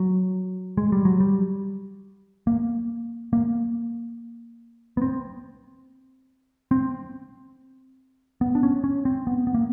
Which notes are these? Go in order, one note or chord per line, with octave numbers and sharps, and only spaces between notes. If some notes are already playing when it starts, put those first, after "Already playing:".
Already playing: F#3
G#3
G3
F#3
G3
A#3
A#3
B3
C4
C4
B3
D4
C#4
C#4
C4
B3
B3
A#3